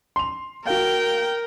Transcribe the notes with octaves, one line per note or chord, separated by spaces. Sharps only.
C6 F7
F#4 A#4 F5 G5